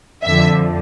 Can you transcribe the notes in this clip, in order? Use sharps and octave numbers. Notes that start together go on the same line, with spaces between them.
F2 D3 F3 E5